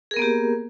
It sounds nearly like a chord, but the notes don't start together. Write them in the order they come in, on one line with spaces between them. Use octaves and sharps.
G#4 A#4 B3 A#3 G4